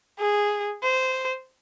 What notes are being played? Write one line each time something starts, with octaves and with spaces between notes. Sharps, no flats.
G#4
C5